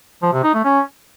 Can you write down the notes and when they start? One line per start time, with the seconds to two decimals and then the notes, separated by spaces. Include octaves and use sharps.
0.23 F3
0.33 C3
0.44 D#4
0.54 A3
0.65 C#4